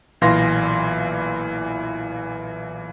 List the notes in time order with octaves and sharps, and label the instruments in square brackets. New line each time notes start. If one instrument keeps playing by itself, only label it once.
[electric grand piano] B1 A#2 E3 F5 C6 A#6